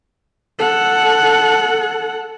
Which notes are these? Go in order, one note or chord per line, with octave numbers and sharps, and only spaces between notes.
A4 F#5